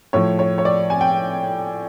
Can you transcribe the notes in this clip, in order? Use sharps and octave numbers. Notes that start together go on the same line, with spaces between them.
A2 F3 C#5
C#5
C#5
D5
G#5
G5